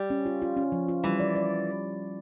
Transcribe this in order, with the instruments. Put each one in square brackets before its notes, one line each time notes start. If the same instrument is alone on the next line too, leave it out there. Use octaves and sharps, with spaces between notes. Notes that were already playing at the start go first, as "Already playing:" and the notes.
Already playing: [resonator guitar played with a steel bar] G3
[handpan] C#4
F4
F4
C#4
F3
F4
[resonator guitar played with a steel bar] E3 [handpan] G3
[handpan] D5
D5